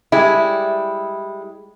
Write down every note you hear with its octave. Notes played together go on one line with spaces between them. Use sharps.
G3 G#3 E4